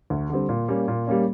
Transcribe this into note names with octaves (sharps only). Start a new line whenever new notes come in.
D2
D3 G3 C4
A#2
G3 A#3 C#4
A#2
G3 A#3 C#4